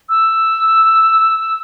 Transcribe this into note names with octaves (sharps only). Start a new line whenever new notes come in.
E6